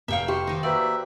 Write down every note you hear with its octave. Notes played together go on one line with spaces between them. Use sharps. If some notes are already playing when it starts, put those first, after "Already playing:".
F1 E5 F5 G5 C#6
G4 C5 C#6
D#3 D#4
A#3 F#4 B4 D5 E5